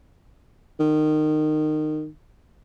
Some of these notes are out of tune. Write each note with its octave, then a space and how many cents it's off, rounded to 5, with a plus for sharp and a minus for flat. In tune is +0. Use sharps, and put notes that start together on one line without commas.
D#3 -20